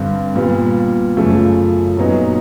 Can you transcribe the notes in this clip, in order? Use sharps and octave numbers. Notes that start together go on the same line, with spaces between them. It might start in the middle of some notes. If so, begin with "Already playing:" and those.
Already playing: G2 D3 G3 C4
A#2 G3 B3
F#2 C#3 F3 A3
A#2 F#3 B3 D#4